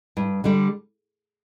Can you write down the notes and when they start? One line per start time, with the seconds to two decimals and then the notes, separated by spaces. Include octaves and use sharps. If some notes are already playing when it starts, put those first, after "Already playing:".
0.17 G2
0.44 D3 G3